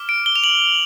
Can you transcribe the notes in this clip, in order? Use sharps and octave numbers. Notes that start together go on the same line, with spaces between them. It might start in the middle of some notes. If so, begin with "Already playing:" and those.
Already playing: D6 F6
D7
G7
F7
F#7